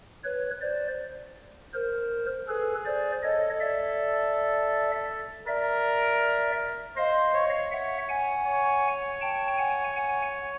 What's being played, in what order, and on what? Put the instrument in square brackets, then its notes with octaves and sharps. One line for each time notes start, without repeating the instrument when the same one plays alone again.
[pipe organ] B4 C#5
C5 D5
A#4 C5
[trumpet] G#4 [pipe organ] A4 B4
[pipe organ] C5 D5
[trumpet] A4 [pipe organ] C#5 D#5
[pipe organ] D5 E5
[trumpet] A#4 [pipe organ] D5 E5
[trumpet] C5 [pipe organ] D#5 F5
[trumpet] C#5
[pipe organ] E5 F#5
F#5 G#5
[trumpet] C#5
[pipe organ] G5 A5
F#5 G#5
F#5 G#5